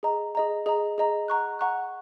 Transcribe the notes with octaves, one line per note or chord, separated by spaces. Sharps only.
G#4 D#5 A#5
G#4 D#5 A#5
G#4 D#5 A#5
G#4 D#5 A#5
F#5 A#5 C#6 F#6
F#5 A#5 C#6 F#6